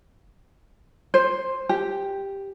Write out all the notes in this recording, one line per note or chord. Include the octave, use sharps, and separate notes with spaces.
C5
G4